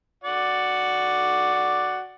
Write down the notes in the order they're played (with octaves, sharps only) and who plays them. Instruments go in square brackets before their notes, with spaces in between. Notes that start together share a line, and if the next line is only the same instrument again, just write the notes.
[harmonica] F#4 D5 F#5